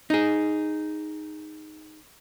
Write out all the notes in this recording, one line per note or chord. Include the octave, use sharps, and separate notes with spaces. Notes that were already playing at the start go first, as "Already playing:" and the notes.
D#4 G#4